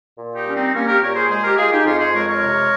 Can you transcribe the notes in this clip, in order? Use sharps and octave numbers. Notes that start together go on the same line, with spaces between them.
A#2
D#4 G4
G3 C#4
C4 D#4
G3 A#3 C#4
G4 A#4
A#2 A#4 C#5
G#4 C5
G#3 G#4 C5
G4 A#4
G#3 F4 G#4
D#4 G4
F2 C#4 F4
G#4 C5
G#3 A#4 C#5
A#4 C#5
C3